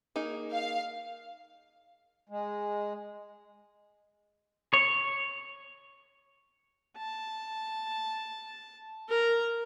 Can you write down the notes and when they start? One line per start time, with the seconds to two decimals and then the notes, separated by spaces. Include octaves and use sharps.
0.16 A#3 D#4 G#4
0.52 F5
2.29 G#3
4.73 C#5
6.97 A5
9.08 A#4 A#5